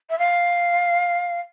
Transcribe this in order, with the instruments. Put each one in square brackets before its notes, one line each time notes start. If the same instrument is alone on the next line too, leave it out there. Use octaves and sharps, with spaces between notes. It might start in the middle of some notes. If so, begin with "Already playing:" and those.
[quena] E5
F5